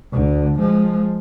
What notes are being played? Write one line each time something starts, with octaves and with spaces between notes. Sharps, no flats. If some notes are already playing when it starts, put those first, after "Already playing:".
D2 D3
F3 G#3